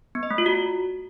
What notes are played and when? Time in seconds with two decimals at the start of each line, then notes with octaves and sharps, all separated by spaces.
0.15 B3
0.23 D#5
0.31 A3
0.38 F4
0.46 F#4